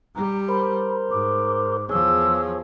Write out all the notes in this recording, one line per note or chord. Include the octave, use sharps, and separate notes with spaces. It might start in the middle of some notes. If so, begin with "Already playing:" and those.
G3 A#5
A#4 C5 B5
G#2 D6
E2 F3 G#4 C#5 E6